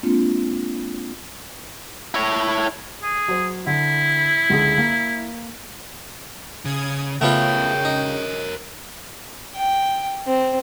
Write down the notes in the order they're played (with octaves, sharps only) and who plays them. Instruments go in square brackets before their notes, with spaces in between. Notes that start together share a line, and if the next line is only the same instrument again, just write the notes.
[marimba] G#3 A#3 C4 D4 F4
[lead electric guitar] E4 C#5
[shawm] G#4
[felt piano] F#3 C5
[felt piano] D3 [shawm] E4
[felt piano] C#2 D3 G#4
A#3
[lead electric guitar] C#3 [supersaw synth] D#6 G#6
[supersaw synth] C#3 [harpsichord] A3 B3 F4 [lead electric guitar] A#4 C#5 [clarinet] G5
[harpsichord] D#4
[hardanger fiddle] G5
C4